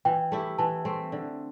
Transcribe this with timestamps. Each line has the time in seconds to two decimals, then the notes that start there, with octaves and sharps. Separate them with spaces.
0.05 E3 G5
0.32 A3 E4 G4
0.58 E3 A5
0.85 A3 C4
1.12 D3